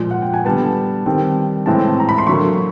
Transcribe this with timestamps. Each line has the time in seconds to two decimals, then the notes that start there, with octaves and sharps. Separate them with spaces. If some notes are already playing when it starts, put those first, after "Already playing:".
Already playing: A#2 F3 G#3
0.11 F#5
0.22 G5
0.34 G#5
0.45 D3 G3 B3 A5
1.06 D#3 G3 C4
1.66 A2 E3 G#3 C4 A5
2.00 A#5
2.09 B5
2.18 C6
2.27 D3 F#3 A#3 C#6